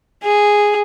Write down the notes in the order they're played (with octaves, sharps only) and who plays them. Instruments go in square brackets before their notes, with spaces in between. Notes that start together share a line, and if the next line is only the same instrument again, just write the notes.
[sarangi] G#4